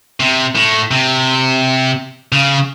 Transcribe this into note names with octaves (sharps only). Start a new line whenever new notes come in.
C3
A2
C3
C#3